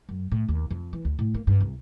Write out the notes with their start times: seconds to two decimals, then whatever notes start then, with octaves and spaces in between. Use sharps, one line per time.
0.09 F#2
0.32 A2
0.48 D#2
0.70 F2
0.93 E3
1.05 D2
1.19 A2
1.34 A#3
1.47 G2
1.60 C2